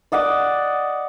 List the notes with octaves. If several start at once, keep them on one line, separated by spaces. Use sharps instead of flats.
D5 D#5 F#5 D6